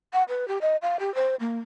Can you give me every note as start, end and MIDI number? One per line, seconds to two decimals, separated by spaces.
0.13 0.23 78
0.28 0.48 71
0.48 0.58 67
0.61 0.76 75
0.82 0.97 77
1.00 1.13 67
1.15 1.35 72
1.40 1.59 58